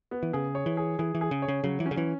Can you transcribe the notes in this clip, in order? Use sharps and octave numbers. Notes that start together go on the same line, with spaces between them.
B3
E3
C#3 G#4
C#5
E3
G#4
E3 G#4
E3
G#4
C#3
C#5
C#3
C#3 F#3
E3
C#4
C#3
E3